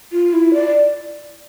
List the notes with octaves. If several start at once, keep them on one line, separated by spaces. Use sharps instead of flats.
F4
E4
D5